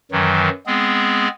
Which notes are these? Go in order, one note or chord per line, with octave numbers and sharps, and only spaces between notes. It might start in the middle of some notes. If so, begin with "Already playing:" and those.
F#2 D#3 E3 F#3
G#3 B3 C4 G#4